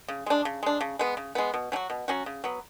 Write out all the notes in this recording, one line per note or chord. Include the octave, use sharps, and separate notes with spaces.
C#3
G#3 D4
C#3
G#3 D4
C#3
G#3 B3
C#3
G#3 B3
B2
F#3 C#4 F#4
B2
F#3 C#4 F#4
C#3
F#3 B3